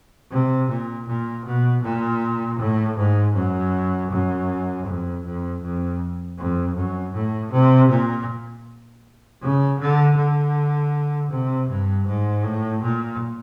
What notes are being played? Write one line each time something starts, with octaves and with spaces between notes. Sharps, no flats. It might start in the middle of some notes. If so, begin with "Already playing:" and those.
C3
A#2
A#2
B2
A#2
A2
G#2
F#2
F#2
F2
F2
F2
F2
F#2
A2
C3
A#2
C#3
D3
D3
C3
G2
G#2
A2
A#2